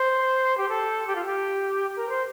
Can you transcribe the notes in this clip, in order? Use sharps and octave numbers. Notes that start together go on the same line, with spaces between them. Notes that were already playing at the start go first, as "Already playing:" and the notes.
Already playing: C5
G4
A4
G4
F4
G4
A#4
C5